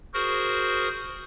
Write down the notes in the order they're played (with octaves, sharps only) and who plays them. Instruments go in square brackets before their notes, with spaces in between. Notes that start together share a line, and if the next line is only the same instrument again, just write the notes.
[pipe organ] F#4 G#4 A#4 C5